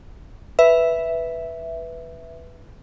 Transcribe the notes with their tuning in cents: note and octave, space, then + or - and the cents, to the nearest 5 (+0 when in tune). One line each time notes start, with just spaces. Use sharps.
B4 +0 E5 +0